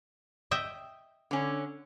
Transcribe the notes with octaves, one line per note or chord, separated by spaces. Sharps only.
D#5 E5 G5
D3 C#4